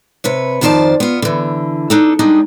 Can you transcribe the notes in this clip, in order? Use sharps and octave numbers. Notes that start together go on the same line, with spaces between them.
C3 B4 C#5
F2 D#3 F3 C5 D5 A5
B3 F4
D3 E3
D4 D#4 A4
G3 G#3 D4 D#4